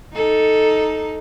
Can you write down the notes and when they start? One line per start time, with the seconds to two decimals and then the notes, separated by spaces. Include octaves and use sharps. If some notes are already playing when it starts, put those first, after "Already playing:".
0.13 D#4 A4